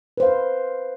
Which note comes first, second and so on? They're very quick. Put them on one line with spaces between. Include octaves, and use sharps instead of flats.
B4 C5 F5